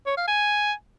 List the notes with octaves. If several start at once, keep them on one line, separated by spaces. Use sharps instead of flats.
C#5
F5
G#5